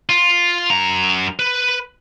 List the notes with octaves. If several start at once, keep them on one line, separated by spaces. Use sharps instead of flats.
F4
F#2 A#5
B4